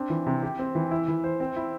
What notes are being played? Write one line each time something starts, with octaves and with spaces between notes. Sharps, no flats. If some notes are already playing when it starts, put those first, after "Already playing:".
Already playing: C4 D4
E3
C3
G4
C4
E3
E4
E3
C5
C4
E4